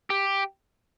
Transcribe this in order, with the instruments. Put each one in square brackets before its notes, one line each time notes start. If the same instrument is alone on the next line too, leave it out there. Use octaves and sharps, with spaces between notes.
[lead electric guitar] G4